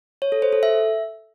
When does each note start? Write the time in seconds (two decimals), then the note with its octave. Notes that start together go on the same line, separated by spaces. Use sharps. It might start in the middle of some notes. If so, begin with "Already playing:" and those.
0.22 C#5
0.32 A4
0.42 C5
0.53 A4
0.63 E5